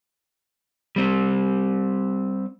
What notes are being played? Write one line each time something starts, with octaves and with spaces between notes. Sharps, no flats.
G3 C4